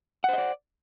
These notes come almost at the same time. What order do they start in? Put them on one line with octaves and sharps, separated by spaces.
F#5 C5 D#5 D5